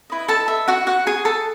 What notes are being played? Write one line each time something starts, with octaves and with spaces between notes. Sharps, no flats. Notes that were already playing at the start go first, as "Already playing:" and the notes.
E4 B4 D#5
A4 A5
E5
F#4 F#5
F#4 F#5
G#4 G#5
A4 A5